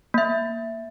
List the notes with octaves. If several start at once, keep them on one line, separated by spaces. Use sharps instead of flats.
A#3 E5